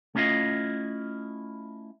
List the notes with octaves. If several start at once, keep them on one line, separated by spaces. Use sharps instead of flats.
A3 C#4 D4 E4 F4 D#5